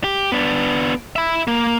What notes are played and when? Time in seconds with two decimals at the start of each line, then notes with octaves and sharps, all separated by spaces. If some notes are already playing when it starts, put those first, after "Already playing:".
0.04 G4
0.32 B3 D4
1.16 E5 B5
1.47 A#3